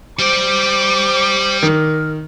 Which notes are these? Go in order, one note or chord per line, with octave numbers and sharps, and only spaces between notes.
G3 C5 D5 D6
D#3 A#4